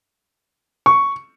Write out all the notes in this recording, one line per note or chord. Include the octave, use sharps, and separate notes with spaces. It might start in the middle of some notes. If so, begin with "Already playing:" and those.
C#6